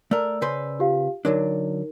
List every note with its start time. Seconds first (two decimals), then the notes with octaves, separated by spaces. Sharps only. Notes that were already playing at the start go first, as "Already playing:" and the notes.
0.11 A3 A#4 D5 E6
0.42 C#3 B4 C5
0.79 F4 G4 F5
1.25 D3 F#3 D4 D#4 A#4